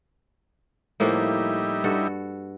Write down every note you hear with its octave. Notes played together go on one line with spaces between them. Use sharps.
A2 F3 G3 A#3 D#4 E4
G2 F#4 A4